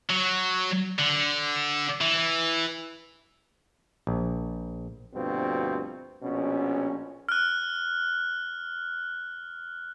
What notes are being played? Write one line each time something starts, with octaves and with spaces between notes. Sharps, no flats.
F#3
D3
E3
A#1
D2 G2 B2 F3 C4
A#1 B2 C#4
F6 F#6